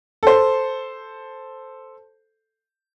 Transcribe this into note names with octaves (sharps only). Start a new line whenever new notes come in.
A4 C5